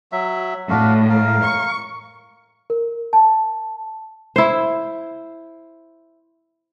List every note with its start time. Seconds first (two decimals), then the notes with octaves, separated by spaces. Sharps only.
0.12 F#3 E5
0.70 A2 D4 F#4 F5
1.09 A#4 F5
1.44 C#6
2.70 A#4
3.13 A5
4.36 E4 C5